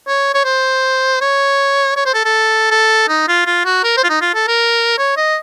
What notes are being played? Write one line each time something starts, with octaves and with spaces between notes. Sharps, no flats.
C#5
C#5
C5
C#5
C#5
C5
A4
A4
A4
D#4
F4
F4
F#4
A#4
C5
F4
D#4
F4
A4
A#4
C#5
D#5